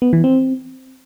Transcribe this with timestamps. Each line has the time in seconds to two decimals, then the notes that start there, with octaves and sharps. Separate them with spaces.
0.02 B3
0.13 E3
0.24 C4